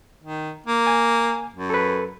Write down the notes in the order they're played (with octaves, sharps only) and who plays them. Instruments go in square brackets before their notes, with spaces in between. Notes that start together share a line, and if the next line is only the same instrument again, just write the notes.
[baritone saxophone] D#3
A#3
[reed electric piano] G#5
[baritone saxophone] F#2
[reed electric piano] A4 B4